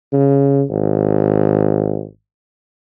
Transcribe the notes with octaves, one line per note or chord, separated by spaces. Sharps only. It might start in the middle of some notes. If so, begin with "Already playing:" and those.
C#3
G#1